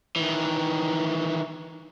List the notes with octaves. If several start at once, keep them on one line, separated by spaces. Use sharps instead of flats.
D#3 E3